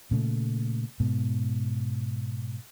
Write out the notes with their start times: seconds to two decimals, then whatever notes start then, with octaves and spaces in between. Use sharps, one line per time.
0.11 A#2 C#3 A3
1.00 G#2 B2